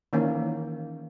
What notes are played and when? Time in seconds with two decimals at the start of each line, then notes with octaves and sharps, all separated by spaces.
0.13 D#3 E3 A#3 C#4